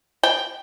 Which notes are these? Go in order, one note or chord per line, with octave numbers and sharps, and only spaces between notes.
G5